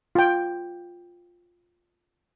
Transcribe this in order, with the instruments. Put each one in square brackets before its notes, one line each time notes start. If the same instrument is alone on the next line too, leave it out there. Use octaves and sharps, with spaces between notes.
[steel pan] F4 G5